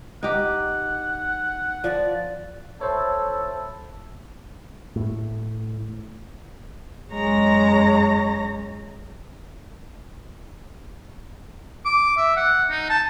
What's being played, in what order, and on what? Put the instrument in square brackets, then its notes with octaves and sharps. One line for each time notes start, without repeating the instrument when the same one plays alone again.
[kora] D#4 G4 [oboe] F#5
[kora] F3 [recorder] D5
[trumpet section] E4 A4 [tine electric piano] C5 C#5
[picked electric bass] A2
[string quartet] F#2 G#3 C#5 A#5 A#6
[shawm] D6
E5
F#5
D#4
A5